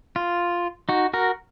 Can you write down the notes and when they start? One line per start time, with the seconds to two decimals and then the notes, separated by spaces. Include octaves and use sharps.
0.16 F4
0.89 D#4 F#4
1.13 F#4 A#4